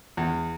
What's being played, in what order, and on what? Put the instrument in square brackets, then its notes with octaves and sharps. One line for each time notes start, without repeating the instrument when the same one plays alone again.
[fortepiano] E2